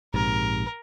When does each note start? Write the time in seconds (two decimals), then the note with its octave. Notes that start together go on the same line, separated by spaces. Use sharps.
0.14 A#1 G#2 C3 A#4